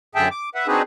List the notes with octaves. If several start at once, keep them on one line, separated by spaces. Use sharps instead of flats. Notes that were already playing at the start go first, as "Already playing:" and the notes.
F#2 D3 G#4 E5 G5 A5
D6
B4 E5 F#5
C4 D4 D#4 F#4 G#4 B4